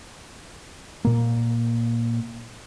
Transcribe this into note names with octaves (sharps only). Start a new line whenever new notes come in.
A#2 A#3